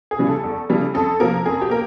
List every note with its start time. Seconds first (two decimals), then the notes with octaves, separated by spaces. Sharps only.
0.11 G#4
0.18 C#3 E3 G3
0.27 A4
0.44 E2
0.69 C#3 E3 G3
0.94 F2 A4
1.20 C3 F3 A#3 A#4
1.46 F2 G#4
1.62 G4
1.70 A#3 A#4